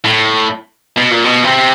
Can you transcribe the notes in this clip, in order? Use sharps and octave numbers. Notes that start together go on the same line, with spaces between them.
A2
B2
A#2
B2
C3